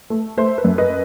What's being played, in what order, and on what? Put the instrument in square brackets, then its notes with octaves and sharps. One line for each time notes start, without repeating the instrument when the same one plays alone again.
[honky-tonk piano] A3
A3 C5 E5
B4
F#2
B4 D#5